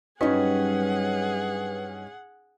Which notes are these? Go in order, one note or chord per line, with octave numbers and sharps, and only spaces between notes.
G2 F#3 C#4 D#4 G#4 B4 F#5